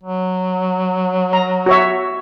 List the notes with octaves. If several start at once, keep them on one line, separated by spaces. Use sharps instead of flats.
F#3
A#5
F#4 C#5 E5